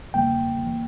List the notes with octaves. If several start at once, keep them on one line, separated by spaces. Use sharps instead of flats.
E2 C#3 G3 A#3 G5
E3 A#3